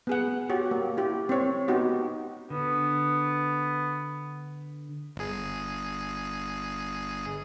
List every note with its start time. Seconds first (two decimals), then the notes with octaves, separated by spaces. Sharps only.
0.07 B3 G#4 F#5
0.49 F#4 G4 C#5
0.71 A#3
0.97 E4 G4
1.29 C4 C#5
1.68 B3 D#4 F#4 G4
2.50 D3 B3
5.16 G1 G#4